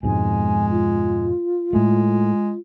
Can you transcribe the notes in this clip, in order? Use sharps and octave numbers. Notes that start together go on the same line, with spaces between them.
F2 G#2 B2 G#3 G#5
F4
A2 G#3 A3